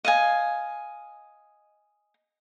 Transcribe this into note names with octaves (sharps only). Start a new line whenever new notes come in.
D#5 F5 G#5